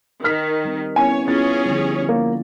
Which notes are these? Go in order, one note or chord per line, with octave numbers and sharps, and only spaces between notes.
D#3 F6 B6
G3 C4
B3 C#4 E4 C#5 G#5
B3 C#4 E4 F4 G#4 C#5 A6
D3 F3 G3
A#3